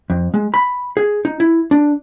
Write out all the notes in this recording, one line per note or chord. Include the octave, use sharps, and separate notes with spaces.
F2
G#3
B5
G#4
D#4
E4
D4